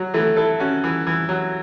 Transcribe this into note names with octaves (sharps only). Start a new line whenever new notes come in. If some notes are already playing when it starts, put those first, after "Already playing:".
Already playing: F#3
E3 A3
E4 A4
C#4 F#4
E3
E3
F#3